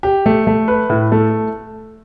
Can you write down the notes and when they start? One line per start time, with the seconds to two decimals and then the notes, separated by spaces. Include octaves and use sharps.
0.03 G4
0.26 A3
0.47 A3
0.68 B4
0.89 A2
1.12 A3